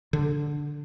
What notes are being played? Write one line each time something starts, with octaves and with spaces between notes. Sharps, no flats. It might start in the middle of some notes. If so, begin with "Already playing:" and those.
D3